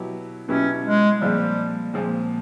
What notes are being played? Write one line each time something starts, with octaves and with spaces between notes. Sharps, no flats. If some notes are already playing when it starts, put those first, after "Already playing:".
Already playing: B2 F#3 B3 E4 G4
B2 F#3 B3 C#4 E4 G4
G#3
A#2 F3 G3 G#3 C4
A#2 F3 G#3 C4